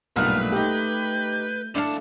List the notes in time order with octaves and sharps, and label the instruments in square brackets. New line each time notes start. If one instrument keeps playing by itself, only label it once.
[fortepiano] B1 G2 A#2 [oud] A3 A#3 [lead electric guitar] B4 [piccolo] F6
[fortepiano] D#4 G4 [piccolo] G6
[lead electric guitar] D#2 A5 [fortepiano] D4 [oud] E4 A4 F5